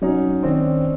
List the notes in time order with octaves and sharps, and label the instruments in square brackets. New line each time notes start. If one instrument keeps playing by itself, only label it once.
[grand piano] F#3 [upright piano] C#4 D#4
[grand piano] D#3 [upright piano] C4 D4